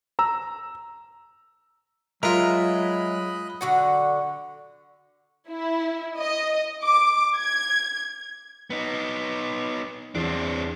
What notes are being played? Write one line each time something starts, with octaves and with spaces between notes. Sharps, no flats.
A#5 E6
F#3 G#3 F4 A#4 D#5 E5 B5 F#6
D3 F#4 F#5
E4
D#5
D6
G#6
B3 D#4
E2 C4 D4